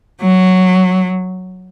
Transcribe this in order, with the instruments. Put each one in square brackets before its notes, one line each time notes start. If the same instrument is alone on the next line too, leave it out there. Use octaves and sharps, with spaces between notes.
[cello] F#3